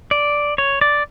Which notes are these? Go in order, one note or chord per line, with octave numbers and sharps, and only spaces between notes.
D5
C#5
D5